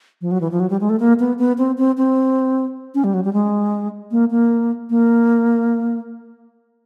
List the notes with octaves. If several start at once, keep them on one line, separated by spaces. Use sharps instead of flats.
F3
F#3
E3
F3
F#3
G3
G#3
A3
A#3
B3
B3
C4
C4
C4
C#4
G3
F#3
G3
G#3
A#3
A#3
A#3